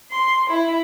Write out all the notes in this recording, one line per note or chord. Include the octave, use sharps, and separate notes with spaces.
C6
E4